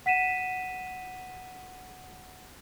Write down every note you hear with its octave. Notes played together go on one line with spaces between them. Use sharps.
F#5 B6 D#7 E7